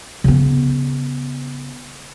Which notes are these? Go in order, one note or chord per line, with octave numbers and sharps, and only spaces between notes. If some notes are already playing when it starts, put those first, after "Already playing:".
C#3 B3